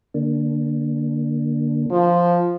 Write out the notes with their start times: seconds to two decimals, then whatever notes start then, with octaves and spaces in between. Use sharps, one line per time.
0.14 D3 A#3 D4
1.91 F3